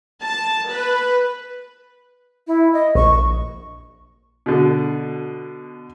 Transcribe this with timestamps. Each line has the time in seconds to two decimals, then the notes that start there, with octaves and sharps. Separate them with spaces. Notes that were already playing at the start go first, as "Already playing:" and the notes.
0.23 A5
0.71 B4
2.47 E4
2.73 D#5
2.95 A#1 C#6
4.46 B2 D3